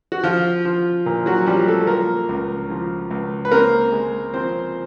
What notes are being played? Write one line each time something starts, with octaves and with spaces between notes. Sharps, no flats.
F#4
F3 F4
F3
A#2
F#3 F#4
F3 G3 G4
A3 A4
F3 A#3 A#4
C#2
F3
C#2
B4
A#3 C4 A#4
G#3
F3 C4 C5